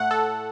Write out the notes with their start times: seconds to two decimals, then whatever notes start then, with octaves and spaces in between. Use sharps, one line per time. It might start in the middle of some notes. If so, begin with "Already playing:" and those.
Already playing: A2 A3 F#5
0.11 A4